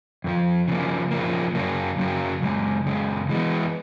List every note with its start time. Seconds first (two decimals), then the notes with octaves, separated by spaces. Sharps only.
0.24 F2 D3 F3
0.68 C#3 F3 A#3
1.11 C#3 F3 A#3
1.55 F#2 C#3 F#3 A#3
1.98 F#2 C#3 F#3 A#3
2.42 F#2 C#3 G#3
2.86 F#2 C#3 G#3
3.29 E3 G#3 B3